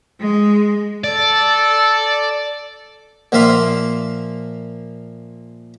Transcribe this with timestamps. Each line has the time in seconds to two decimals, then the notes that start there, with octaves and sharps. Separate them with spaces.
0.20 G#3
1.04 A4 D5
3.32 A#2 F3 A#3 E5 F5 C6